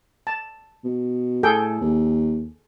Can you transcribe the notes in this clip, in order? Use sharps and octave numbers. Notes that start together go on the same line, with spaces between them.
A5
B2
A2 G#4 A4 G5
D#2